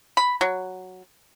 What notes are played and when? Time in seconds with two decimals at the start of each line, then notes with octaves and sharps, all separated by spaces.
0.17 B5
0.41 F#3